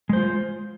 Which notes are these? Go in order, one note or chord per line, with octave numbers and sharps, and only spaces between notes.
G#3 F4 C5